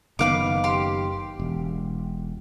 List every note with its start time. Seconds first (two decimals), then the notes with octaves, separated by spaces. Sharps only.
0.19 F#1 D#3 B3 B4 F5 D6
0.64 G4 C6
1.40 E1